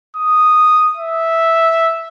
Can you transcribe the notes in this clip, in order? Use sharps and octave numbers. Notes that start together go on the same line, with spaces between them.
D#6
E5